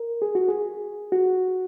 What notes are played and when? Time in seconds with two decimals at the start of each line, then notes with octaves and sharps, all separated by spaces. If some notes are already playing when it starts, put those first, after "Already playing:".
Already playing: A#4
0.22 G#4
0.35 F#4
0.48 G#4
1.12 F#4